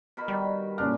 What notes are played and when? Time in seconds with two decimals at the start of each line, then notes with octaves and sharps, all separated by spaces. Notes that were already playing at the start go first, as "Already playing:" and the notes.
0.17 B2 A#4 B5
0.28 D#3 G3
0.78 A#2 C#4 D4 F6